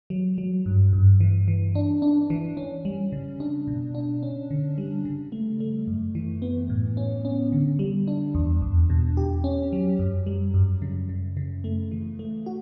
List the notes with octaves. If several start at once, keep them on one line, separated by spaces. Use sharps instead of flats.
F#3
F#3
G2
G2
E3
E3
D4
D4
E3
C#4
G3
C#3
D4
B2
D4
C#4
D3
G3
C#3
A3
A3
F#2
E3
B3
A2
C#4
C#4
D3
G3
D4
E2
E2
B2
G4
C#4
F#3
F#2
G3
F#2
C#3
C#3
C#3
A3
E3
A3
F#4